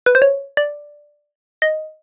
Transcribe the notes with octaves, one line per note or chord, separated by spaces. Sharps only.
B4
C5
C#5
D5
D#5